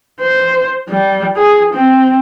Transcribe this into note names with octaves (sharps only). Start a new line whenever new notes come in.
C5
G3
G#4
C4